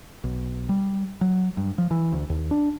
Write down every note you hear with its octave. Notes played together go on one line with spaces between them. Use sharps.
B1
G3
F#3
G2
F3
E3
D2
D#2
D4